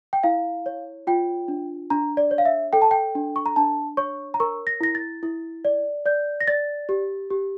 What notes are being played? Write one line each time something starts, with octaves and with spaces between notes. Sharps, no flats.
G5
E4 F5
C#5
F4 G5
D4
D4 A#5
D5
C#5
F5
E5
A4 G5
A5
G5
D4
C#6
A#5
D4 A5
C#5 C#6
A#5
A#4 C#6
A#6
E4 A#6
A6
E4
D5
D5 G6
A#6
D5 A6
G4
G4